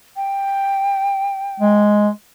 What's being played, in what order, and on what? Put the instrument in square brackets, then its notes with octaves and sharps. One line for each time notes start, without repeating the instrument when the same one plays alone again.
[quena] G5
[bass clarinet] G#3